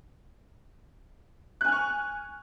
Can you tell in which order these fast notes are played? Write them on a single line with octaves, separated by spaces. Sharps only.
F#6 G#5 F6 C#6